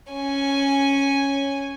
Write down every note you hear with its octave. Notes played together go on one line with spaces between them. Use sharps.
C#4 G#5